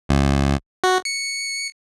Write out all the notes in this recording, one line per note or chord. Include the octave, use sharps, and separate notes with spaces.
C#2
F#4
C#7